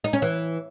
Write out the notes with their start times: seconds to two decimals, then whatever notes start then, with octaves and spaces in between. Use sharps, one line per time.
0.04 D#4
0.13 C#4
0.22 E3